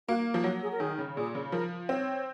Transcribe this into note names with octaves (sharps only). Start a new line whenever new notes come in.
A#3 F#4
F3
F#3 F#4
G#4
A#4
D#3 G#4
C#3
A#2 G#4
C#3
F3 A#4
C4 C#5